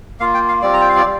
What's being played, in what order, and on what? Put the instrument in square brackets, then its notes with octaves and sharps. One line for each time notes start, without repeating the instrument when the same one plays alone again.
[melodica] A#3 F4 F5
G5
F5
G3 C4 F4 D5
A#5
G5
F5
D5
G3